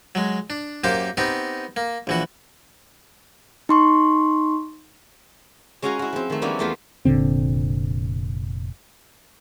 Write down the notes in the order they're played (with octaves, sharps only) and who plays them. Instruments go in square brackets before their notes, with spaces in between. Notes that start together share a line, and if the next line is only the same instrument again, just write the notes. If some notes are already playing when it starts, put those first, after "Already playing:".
[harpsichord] F#3 G#3
D4
F#2 A#3 G4 C5 D6
B3 C4 D#4 G4
A#3
A#1 E3 F#4
[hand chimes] D#4 C6 C#6
[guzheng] G#3 C#4 F#4 F5 G#5 A#5
E4 F#4
F3 C4
D#3 A3
F3 G3 A#3 B3 C#4 E4
E2 F3 A3 B3 F4 C5
[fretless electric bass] F1 A#2 D3 C4